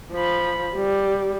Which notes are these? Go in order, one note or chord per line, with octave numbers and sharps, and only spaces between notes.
F3 B5
G3